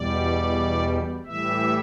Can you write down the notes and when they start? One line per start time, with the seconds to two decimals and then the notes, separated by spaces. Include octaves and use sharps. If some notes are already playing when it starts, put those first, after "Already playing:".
Already playing: E2 B2 G3 D5
1.25 A2 E3 G3 E5